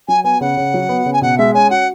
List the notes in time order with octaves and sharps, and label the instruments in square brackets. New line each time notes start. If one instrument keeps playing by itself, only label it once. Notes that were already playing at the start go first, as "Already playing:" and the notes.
[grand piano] F#3 [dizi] G#5
[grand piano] B3 [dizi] G#5
[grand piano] C#3 [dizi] F#5
[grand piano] C#3
F#3
B3
C#3
[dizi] G#5
[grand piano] B2 [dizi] F#5
[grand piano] G#3 [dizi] E5
[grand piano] C#4 [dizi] G#5
[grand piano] F#4 [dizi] F#5